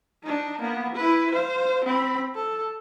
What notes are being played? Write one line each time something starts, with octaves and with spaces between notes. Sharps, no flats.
D4 D#4
A#3 B3
E4 B4
C5 F5
C4 B5
A4